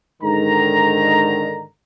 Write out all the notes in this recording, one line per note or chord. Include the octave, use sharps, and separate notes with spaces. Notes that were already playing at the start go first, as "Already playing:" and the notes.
G#2 D3 D#3 A#5